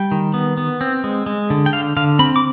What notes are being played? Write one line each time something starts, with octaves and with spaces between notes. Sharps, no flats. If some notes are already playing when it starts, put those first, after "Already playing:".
Already playing: G3 G5
D#3
B3
B3
C4
G#3
G#3
D3
G5
D3 F5
D3 F5
C4 B5
D6